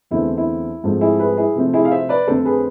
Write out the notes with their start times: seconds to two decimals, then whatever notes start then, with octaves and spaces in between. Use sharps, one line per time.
0.11 E2 D3 A3 C4 E4
0.38 E4
0.84 G#2 F3 A3 C4
1.01 E4 G#4
1.19 G#4 B4
1.37 E4 G#4
1.56 C3 F3 A3 C4
1.74 E4 G#4
1.85 F5
1.91 C5 E5
2.09 B4 D5
2.27 F2 D3 A3 C4 A4 C5
2.45 G#4 B4